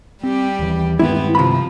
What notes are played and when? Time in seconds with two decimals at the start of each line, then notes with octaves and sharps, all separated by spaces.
0.23 G3 C4 G4
0.59 D#2 E3
0.99 G2 D#3 G#3 B3 C4 E4
1.35 C3 F3 B5